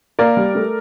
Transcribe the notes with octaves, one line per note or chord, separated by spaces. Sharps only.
A#3 A#4 D5
G3
A3